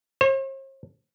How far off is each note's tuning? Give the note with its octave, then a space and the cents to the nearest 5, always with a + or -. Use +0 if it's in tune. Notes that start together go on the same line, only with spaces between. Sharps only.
C5 +45